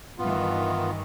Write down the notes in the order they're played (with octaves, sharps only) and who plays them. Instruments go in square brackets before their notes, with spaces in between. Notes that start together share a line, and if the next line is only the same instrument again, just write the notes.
[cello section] G2 D#3 E3 [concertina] B3 F4